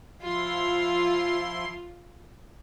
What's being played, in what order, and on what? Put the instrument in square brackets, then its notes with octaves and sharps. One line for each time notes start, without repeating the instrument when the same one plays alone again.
[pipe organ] F3 E4 C6 [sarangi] F4